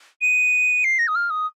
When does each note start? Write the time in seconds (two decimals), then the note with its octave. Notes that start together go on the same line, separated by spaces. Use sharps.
0.22 D#7
0.84 C7
0.99 A#6
1.08 D#6
1.15 F6
1.30 D#6